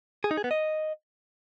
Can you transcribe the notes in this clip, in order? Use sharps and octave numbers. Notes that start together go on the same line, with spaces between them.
G#4
D#4
G#4
B3
D#5